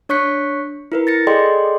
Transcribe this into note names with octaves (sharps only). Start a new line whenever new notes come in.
D4 C#5 C#6 F#6 B6 C#7
E4 A#4 B4
A6 A#6 C#7
G#4 A4 D5 D#5 G5 C6